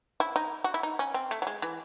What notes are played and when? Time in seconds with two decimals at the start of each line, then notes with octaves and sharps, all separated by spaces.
0.20 E4
0.36 D#4
0.64 F#4
0.74 E4
0.83 D#4
0.99 C#4
1.14 C4
1.31 A3
1.42 F#3
1.47 G#3
1.62 E3